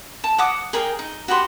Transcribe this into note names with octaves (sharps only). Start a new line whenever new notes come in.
A5
F#5 D6 D#6
G#4 A#4 D#5 G5
D#4
F#4 G4 B5 C6